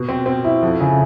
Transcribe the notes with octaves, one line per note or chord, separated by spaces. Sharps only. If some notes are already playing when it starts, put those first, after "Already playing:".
Already playing: B2
C4
C4
E4
F2
C#3